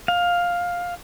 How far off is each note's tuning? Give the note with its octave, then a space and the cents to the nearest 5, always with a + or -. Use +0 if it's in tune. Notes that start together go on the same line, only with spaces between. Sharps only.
F5 +10